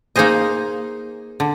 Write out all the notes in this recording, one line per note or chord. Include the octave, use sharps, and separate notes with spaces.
A#3 D#4 G#4 C5 D#5
D3